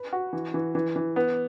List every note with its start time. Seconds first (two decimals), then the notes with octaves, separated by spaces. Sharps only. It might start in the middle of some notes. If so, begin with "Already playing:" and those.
Already playing: B4
0.13 F#4
0.33 E3
0.54 E3
0.75 E3
0.96 E3
1.16 B3